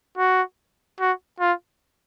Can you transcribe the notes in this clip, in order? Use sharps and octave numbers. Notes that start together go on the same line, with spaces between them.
F#4
F#4
F4